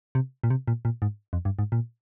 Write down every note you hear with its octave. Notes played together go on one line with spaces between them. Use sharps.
C3
A#2
C3
A#2
A#2
G#2
F2
G2
G#2
A#2